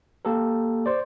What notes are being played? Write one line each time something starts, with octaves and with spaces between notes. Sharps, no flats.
A#3 G4 A4 A#4
C5 D5